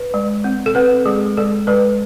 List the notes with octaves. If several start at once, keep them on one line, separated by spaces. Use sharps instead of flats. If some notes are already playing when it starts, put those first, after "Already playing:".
Already playing: B4
G#3
C4
A4
C4 B4
G#3 G#4
G#3 A4
G#3 B4